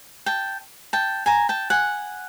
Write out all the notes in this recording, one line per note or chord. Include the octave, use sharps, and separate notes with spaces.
G5 A5
G5 A5
G#5 A#5
G5 A5
F#5 G#5